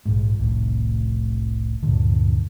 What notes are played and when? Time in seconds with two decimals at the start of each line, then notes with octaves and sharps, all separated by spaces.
0.05 A#1 G#2
0.39 F1 C2 A2
1.83 D2 G2 A#2 D3